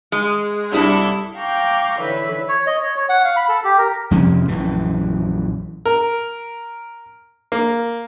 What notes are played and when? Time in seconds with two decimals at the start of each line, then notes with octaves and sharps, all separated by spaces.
0.12 G#3
0.72 C2 D4 E4 G4 A4 D#6
1.36 F5 G5 A#5 C#6 D6 G6
1.99 D3 E3 B4 C#5 E5
2.49 C#5
2.67 D#5
2.83 C#5
2.96 C#5
3.09 F#5
3.25 F5
3.37 B5
3.49 A4
3.64 G4
3.78 A#4
4.11 F2 C3 F3 C#4
4.48 A#1 F#2 E3
5.85 A#4
7.52 A#3